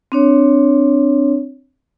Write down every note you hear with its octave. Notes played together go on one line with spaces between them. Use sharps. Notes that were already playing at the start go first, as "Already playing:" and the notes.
C4 D4 C#5